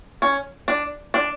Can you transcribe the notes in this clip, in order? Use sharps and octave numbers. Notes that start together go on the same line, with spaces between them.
C#4
D4
D4